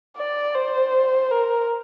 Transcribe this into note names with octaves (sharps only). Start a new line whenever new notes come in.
D5
C5
A#4